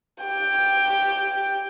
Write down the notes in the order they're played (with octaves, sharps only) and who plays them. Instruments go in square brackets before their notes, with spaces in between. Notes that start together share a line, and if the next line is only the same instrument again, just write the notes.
[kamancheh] G4 G5